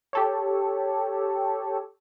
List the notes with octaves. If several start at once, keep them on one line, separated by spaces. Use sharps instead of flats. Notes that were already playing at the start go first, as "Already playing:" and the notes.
G4 A4 C#5